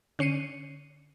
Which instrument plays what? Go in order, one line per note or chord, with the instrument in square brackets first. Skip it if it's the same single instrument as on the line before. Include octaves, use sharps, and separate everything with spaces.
[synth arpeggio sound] D3 C#4 C7 C#7 D#7